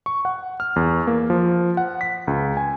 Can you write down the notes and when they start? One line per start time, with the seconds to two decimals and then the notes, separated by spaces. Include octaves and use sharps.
0.06 C#6
0.25 F#5
0.60 F6
0.76 E2
1.07 A#3
1.30 F3
1.77 F#5
2.01 B6
2.27 C#2
2.57 G#5